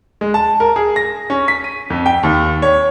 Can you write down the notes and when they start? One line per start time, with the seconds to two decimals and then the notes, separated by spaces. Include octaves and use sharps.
0.21 G#3
0.34 A5
0.60 A#4
0.76 G#4
0.96 A#6
1.30 C#4
1.48 B6
1.64 D#7
1.90 F2
2.06 G5
2.23 D#2
2.62 C#5